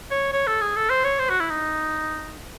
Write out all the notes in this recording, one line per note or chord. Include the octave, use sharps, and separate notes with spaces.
C#5
C#5
A4
G#4
A4
C5
C#5
C5
F#4
E4
D#4